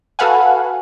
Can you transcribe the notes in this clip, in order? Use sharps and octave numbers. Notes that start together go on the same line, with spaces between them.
F#4 A4 B4 F5 F#5 G#5